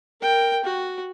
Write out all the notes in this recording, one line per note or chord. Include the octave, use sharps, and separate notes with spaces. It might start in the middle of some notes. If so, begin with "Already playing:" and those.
A#4 G5
F#4